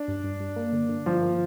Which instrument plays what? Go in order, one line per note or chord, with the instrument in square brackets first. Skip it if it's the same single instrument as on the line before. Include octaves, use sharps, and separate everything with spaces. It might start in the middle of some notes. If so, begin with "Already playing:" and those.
Already playing: [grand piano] D4
[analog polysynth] G2
G2
G2
A#3
D3
D3
[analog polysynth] G2 [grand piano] F3
[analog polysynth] A#3